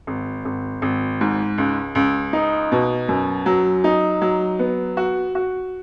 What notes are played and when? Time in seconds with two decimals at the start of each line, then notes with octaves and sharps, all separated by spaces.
0.07 G#1
0.45 G#1
0.82 G#1
1.21 G#2
1.58 C#2
1.95 C#2
2.33 D#4
2.72 B2
3.08 F#2
3.46 F#3
3.84 D#4
4.21 F#3
4.59 B3
4.97 F#4
5.35 F#4